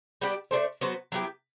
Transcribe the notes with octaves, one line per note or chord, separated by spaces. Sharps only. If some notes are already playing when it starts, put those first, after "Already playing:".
G3 B3 D4 G4
A3 D4 A4 C5
F#3 B3 F#4 C5
F#3 B3 E4 G4